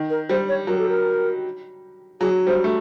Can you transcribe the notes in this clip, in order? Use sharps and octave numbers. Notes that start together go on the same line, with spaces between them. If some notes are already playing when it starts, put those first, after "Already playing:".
Already playing: D#3
A#4
G3 C5
C#5
F#3 A#4
A4
A#4
F#3 G#4
G3 C5
A3